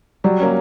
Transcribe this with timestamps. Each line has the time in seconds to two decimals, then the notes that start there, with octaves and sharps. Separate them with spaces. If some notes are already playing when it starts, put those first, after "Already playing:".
0.24 F#3 G3
0.40 A#3 C#4